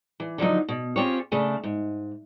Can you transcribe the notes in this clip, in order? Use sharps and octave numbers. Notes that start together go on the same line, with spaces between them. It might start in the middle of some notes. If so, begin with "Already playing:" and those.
E3
D3 F3 F#3 D#4
B2
C4 C#4 F4 G4 G#4 C#5
C#3 A3 D4
G#2